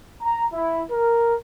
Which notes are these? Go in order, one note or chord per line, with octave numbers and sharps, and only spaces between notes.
A#5
E4
A#4